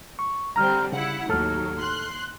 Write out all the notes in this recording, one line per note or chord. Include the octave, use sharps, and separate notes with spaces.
C#6
D3 G3 C4 A#5 F6
C#3 E4 F#5
D#2 A2 F#3 A4 F6
C6 F#6